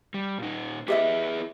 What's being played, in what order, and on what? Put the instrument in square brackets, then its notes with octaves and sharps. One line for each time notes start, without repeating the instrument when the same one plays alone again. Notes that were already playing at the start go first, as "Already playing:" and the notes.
[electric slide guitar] G3
A#2 D#4
[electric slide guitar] E4 G#4 B4 [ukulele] G4 D#5 E5